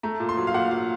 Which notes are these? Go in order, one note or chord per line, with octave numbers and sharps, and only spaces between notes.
A3 A#5
A#2
C6
F#3
F5
A#2 F#5
F#3 F5